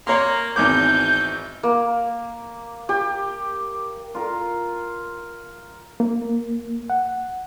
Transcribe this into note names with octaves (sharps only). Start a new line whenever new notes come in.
A#3 C#5 A#5 C6
G#1 E2 E3 C4 D#4 D6 G6
A#3
G4
F4 A#4
A#3
F#5